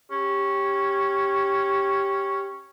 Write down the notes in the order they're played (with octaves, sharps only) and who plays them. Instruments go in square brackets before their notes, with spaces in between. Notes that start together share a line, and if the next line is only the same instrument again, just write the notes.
[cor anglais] C#4 [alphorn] G4